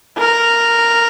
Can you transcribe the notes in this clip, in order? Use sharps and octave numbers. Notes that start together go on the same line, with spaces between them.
A#4